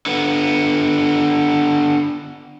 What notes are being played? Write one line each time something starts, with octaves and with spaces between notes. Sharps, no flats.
D3 B3